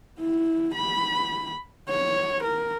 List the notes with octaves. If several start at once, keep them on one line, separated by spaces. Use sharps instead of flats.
E4
B5
C#5
A#4